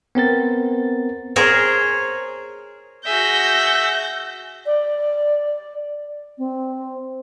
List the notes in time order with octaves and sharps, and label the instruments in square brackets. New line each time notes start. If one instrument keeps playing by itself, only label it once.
[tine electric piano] B3 C4 A#4 A6
[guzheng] G#4 A#4 C5 C#5
[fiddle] F#4 G#4 [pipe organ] E5 [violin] G6 A#6
[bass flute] D5
C4